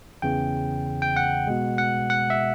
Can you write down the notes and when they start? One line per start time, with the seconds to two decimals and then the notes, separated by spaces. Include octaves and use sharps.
0.22 E2 C#3 E3 G5
1.02 G5
1.16 F#5
1.47 B2 G#3
1.78 F#5
2.10 F#5
2.30 E5